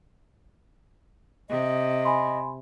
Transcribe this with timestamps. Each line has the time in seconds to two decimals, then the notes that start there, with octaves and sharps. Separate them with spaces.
1.49 C3 D#5
2.05 G#5 B5 C6